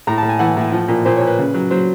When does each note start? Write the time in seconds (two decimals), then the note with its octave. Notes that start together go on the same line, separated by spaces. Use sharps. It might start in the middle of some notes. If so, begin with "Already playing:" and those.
0.07 A2 A#5
0.18 A5
0.23 A2
0.29 G#5
0.39 E3 F#5
0.57 A2
0.72 F3
0.88 A#2
1.05 A#2 C5
1.16 C#5
1.21 A#2
1.27 B4
1.39 C#3
1.54 F#3
1.70 F#3 C5